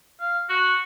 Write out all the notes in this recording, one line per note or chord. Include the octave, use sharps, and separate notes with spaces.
F5
F#4